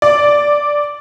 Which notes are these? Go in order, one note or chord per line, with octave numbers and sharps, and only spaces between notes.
D5